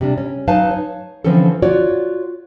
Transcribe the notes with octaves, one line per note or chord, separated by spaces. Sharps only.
C3 G3 D4
C#4
F#3 D#4 B4 F5 G#5 A5
C#5
D3 E3 F3 C4 C#4 A4
F4 F#4 C#5 D5